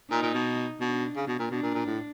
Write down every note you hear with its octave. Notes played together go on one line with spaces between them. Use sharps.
A#2 D#4
A#2
B2
B2 D4
C#3
B2
A#2
B2 D4
A#2
A#2
A2